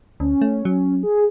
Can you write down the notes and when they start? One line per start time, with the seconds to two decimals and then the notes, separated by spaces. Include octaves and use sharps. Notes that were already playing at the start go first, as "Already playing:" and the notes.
0.20 D2 C#4
0.42 A3
0.65 F#3
1.03 G#4